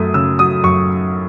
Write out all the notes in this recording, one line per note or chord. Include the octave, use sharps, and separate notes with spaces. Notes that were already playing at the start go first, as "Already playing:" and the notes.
Already playing: F#2 A3 D#6
C#3 E6
F#3 D#6
F#2 C#6